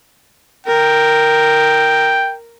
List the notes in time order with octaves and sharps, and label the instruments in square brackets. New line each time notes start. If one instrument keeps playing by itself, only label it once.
[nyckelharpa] A#4 [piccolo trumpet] G5